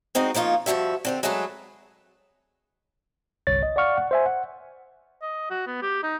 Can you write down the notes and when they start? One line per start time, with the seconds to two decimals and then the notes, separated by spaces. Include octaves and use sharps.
0.15 G#3 C4 D#4 F#4 D#5
0.34 F3 A#3 D#4 F4 C#5
0.66 G2 F3 C#4 F#4 E5
1.05 D3 C4 G4
1.23 F#3 G#3 A3 G#4 A4 B4
3.47 G1 C2 C#5 A6
3.63 D#5
3.76 D5 F5 F#5 C#6 F6
3.97 F#5
4.11 C5 E5 G#5
4.26 F#5
5.22 D#5
5.51 F#4
5.67 B3
5.82 G4
6.03 D#4